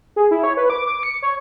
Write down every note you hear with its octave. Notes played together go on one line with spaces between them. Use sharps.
G#4
E4
C#5
B4
D6
D6
C#7
C#5